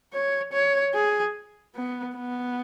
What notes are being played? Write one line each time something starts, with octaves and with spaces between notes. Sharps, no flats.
C#5
C#5
G#4
B3
B3